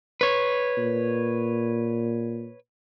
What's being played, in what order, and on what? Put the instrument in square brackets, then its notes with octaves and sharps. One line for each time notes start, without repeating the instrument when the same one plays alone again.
[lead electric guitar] B4 C#5
[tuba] A#2